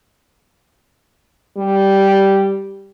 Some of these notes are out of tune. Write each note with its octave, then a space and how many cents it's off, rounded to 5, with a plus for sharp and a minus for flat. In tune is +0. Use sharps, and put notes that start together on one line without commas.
G3 -5